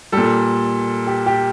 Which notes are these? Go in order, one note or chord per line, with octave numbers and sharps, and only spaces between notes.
A#2 G3 A4
G4
G4